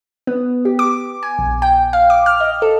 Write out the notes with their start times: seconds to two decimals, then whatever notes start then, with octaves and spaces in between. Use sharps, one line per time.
0.27 B3
0.65 G4
0.79 D6
1.23 G#5
1.39 A#1
1.62 G5
1.93 F5
2.10 D6
2.26 F6
2.40 D#5
2.62 A4